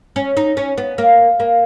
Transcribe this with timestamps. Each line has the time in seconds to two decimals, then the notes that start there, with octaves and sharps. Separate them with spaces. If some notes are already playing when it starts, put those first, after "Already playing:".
0.16 C#4
0.37 D#4
0.57 C#4
0.78 B3
0.98 A#3
1.40 A#3